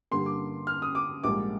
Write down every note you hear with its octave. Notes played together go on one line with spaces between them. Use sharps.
G2 D3 G3 A#3 C6
D6
F6
D#6
D6
A#1 G#2 G3 A#3 D6